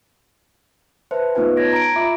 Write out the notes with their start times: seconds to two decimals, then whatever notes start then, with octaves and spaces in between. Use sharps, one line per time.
1.11 B4 C5 E5 A5
1.35 A3 B3 D#4 F4 B4 G#5
1.57 C#5 A5 G#6 A#6 D7
1.73 A#5 D7
1.96 F4 E5 B5 D6